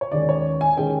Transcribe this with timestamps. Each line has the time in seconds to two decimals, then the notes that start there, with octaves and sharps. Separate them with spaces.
0.01 C#5
0.12 D#2 D#3 G#3 C#4 D5
0.29 C#5
0.61 G#5
0.77 D#3 G#3 C#4 G5